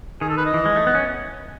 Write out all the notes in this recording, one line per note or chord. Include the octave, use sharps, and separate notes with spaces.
D#3 G#4
A4
B4
D#5
E3
G#3
A3
B3
C#4